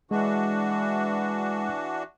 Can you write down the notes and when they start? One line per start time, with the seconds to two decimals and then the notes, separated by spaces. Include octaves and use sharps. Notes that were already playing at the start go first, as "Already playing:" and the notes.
0.11 E3 G#3 D4 F#4